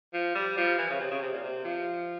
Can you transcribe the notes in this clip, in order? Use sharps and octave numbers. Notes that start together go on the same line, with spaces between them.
F3
G3
F3
E3
C#3
C3
C#3
C3
A#2
C3
F3